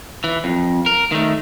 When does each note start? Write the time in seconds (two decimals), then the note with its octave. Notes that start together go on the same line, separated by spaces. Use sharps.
0.24 E3
0.44 F2
0.86 A#4
1.12 D#3 A3